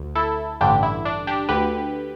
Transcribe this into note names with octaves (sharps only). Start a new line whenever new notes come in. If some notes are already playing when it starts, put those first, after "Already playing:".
Already playing: D2
E4 A4
A1 G2 D3 D4 G4
E4
D4
D4 G4
D2 D3 G4 B4